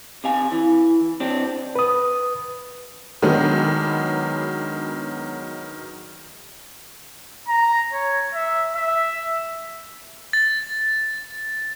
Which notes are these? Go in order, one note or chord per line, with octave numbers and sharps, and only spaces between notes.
C3 F5 G#5
E3
C4 D4 G4
B4 D#6
D#3 F#3 G#3 B3 D4
A#5
C#5
E5
E5
A6